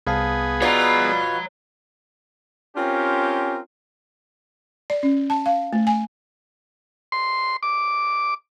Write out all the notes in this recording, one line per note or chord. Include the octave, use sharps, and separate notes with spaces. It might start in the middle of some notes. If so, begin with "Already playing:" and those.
C2 B3 G#4 F5 A5
B2 F4 B4 C#5 D5 A#5
C4 C#4 F4 G4 A#4
D5
C#4
A5
F5
A3
G#5
C6
D6